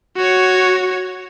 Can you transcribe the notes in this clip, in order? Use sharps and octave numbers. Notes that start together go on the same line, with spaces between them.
F#4 C#5